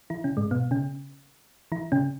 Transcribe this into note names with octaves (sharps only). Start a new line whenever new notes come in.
E3 E4
C#3 C#4
G#2 G#3
B2 B3
C#3 C#4
E3 E4
C#3 C#4